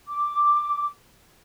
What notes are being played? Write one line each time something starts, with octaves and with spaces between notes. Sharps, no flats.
D6